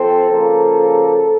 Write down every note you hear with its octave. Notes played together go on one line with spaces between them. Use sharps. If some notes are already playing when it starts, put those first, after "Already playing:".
Already playing: F3 C4 A4
C#3 F3 A#3